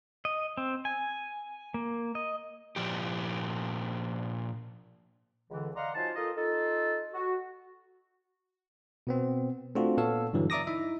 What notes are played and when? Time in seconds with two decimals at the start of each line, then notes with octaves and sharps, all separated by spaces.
0.25 D#5
0.57 C4
0.85 G#5
1.74 A#3
2.15 D#5
2.76 A#2 F3 G4
5.50 C#2 D3 E3
5.75 D5 D#5 F5 F#5 A#5 C6
5.95 F#3 D#4 F4 C5 G#5 A5
6.15 D#4 F4 A4 A#4 D#5
6.37 D#4 F4 A4
7.13 F#4
9.07 B2 B3 C4
9.75 A3 C4 D4 F4 F#4
9.98 A#2 B3 A4 C#5 F5 E6
10.33 G2 D3 E3 F#3
10.50 D5 E5 A#5 D6 D#6 A#6
10.67 D#4 E4 E5